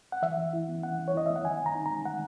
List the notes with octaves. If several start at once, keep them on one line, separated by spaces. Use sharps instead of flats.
F#5
E3 E5
E3
E4
B3
E3 F#5
E3
C#5
E4 D#5
B3 E5
F#5
D#3 G#5
D#3
A#5
D#4
A#5
G#3
D#3 F#5